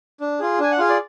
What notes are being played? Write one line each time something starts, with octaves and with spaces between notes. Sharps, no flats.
D4
F4 G#4
D4 G#5
F#5
F4 G#4 F5
D5